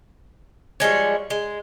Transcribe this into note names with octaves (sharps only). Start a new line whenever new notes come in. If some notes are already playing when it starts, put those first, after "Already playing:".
F3 G3 G#3 C#5
G#3